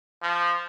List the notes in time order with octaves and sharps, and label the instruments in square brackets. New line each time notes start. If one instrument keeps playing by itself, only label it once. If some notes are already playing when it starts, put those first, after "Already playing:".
[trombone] F3